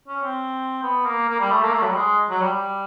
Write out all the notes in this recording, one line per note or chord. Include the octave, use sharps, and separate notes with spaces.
C#4
C4
B3
A#3
A#3
G3
A3
A#3
A3
F#3
G3
G#3
F#3
G3
G3